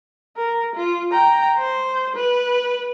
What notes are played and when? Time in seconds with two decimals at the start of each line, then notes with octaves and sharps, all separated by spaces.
0.36 A#4
0.75 F4
1.12 G5 A#5
1.58 C5
2.16 B4